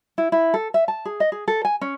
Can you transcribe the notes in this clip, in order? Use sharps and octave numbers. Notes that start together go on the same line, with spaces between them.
E4
E4
A4
E5
A5
G#4
D#5
G#4
A4
G#5
C#4